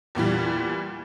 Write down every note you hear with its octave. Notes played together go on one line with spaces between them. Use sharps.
E2 A#2 E3 G3